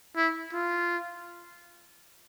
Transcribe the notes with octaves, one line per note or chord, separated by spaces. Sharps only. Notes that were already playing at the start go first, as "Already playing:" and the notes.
E4
F4